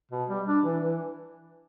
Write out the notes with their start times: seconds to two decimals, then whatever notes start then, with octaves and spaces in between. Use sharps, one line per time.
0.11 B2
0.29 G3
0.47 D4
0.65 E3
0.82 E3